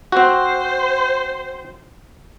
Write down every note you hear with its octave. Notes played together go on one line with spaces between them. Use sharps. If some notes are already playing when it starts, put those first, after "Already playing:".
C4 F#4 C5